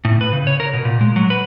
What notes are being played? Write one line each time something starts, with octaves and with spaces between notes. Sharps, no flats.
A2
B4
C#3
C#5
A#4
B2
A#2
G#3
F#3
B4